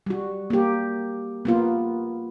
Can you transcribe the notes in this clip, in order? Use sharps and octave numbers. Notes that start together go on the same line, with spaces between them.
G3 F#4
A#3 G4
A#3 B3 F4